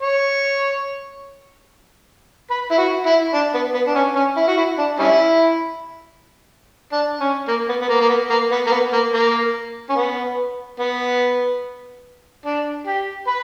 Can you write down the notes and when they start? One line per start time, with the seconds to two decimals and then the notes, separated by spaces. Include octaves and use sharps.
0.02 C#5
2.50 B4
2.71 E4
2.78 F#4
3.06 E4
3.34 D4
3.54 B3
3.74 B3
3.87 D4
3.95 C#4
4.16 C#4
4.36 E4
4.48 F#4
4.57 E4
4.78 D4
4.99 G3 C#4 E4
6.92 D4
7.20 C#4
7.48 A#3
7.69 B3
7.81 B3
7.89 A#3
8.01 A#3
8.10 B3
8.30 A#3
8.52 B3
8.67 A#3
8.72 B3
8.93 A#3
9.13 A#3
9.89 C#4
9.96 B3
10.79 B3
12.46 D4
12.87 G4
13.27 B4